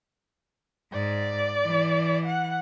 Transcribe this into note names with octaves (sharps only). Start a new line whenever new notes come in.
G#2 D5
E3
F#5